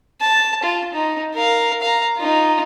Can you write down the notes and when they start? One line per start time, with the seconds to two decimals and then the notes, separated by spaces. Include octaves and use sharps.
0.21 A5
0.63 F4
0.94 D#4
1.34 A#4 F5
1.81 F5 A#5
2.18 D#4 F4